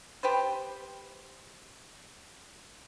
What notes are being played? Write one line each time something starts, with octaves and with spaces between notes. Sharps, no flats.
G4 B4 C5